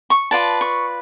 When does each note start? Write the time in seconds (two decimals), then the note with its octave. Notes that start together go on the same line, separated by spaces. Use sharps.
0.10 C#6
0.31 F4 B4 D5 A5
0.61 C#6